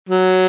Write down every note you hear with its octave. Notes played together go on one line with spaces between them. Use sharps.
F#3